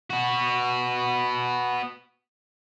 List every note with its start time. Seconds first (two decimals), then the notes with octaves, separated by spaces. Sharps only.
0.10 B3 F#4